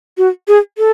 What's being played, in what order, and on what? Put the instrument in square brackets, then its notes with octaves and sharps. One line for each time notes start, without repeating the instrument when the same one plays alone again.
[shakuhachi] F#4
G#4
A4